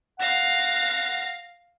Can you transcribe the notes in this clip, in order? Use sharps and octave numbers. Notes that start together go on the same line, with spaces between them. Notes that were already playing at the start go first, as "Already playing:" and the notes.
F5 F#5 A#6